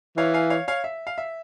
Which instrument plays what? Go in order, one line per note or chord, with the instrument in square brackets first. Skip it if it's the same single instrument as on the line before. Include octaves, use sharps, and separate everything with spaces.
[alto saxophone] E3 [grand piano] C#5 F5
[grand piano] F5 G#5
C#5 F5
C#5 F5
E5
F5
E5